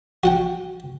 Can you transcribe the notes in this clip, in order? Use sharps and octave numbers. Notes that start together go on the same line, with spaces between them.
F#4 F#5 G5